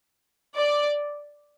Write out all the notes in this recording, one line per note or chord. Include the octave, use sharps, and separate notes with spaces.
D5